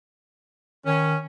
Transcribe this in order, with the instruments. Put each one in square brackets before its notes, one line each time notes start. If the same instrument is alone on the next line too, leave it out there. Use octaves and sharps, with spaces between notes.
[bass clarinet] D#3 [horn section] C#4